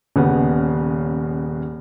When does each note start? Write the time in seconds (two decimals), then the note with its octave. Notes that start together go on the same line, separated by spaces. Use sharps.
0.16 D#1 C#3 B3